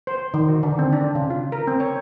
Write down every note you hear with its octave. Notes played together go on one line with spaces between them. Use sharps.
C5
D#3
F#4
D3
C4
D4
C#3
F4
A#4
C4
C#5